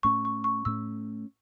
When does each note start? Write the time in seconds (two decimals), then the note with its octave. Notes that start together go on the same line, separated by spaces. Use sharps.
0.03 A2 A3 C#4 C#6
0.25 C#6
0.44 C#6
0.65 A2 A3 C#4 E6